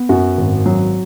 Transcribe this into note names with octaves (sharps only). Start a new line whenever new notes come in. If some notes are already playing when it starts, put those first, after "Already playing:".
Already playing: B3
F#2 F#4
G#1
F#3